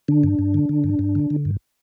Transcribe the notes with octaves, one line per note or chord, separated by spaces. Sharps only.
D3 D4
G2
G2
D3
D3
G2
G2
D3
D3
G2